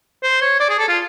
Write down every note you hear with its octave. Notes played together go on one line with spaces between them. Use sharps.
C5
C#5
D5
G#4
A4
F4